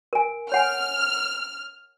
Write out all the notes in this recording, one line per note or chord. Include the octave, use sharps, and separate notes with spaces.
A#4 G#5
C#5 F#5 G#5 F6